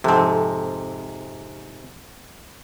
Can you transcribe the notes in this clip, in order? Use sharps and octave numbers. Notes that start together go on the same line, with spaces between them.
F2 G#2 C3 C4